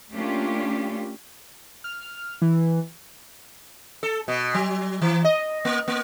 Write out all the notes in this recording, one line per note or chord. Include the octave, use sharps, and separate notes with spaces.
A3 A#3 C#4 D4 F4 G4
F6
E3
A4
B2
F#3
E3
D#5
A#3
A#3